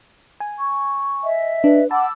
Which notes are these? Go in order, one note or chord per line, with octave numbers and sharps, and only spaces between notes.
G#5
C#6
D#5 E5
D4 B4
F#5 A5 B5 D6 E6